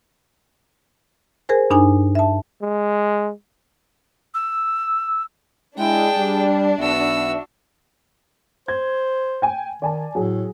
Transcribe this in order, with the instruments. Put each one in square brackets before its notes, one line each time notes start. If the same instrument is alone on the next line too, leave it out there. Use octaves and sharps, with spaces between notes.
[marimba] G#4 A#4 C5 G#5
G2 D4 D#4 G#5
E5 A5
[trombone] G#3
[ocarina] E6
[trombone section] G#3 E4 [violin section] D4 [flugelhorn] G#4 [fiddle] G5 A5
[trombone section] G3
[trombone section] B1 B3 [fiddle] F#4 E6 [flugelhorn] E5
[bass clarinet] C5 [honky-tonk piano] G#6
[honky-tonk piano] G5 G#5
[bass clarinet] D#3 [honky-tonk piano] D5 G#5 A5
[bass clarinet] A2 [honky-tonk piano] F#3 G#4